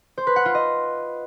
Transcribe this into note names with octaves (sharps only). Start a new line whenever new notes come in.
C5
B4
F#5
F4
D#5